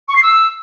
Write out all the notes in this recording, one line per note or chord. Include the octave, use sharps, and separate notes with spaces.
C#6
C7
E6